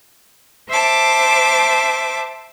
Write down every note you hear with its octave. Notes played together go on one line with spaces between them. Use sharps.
C5 E5 A5 D6